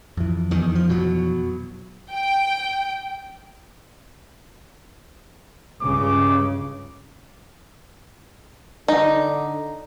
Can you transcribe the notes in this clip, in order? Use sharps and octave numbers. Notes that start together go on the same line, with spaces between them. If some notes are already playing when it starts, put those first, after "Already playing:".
F2 E3
E2 D#3
F3
B2 F#3
G5
C#2 G2 C#3 D6
D3 D#4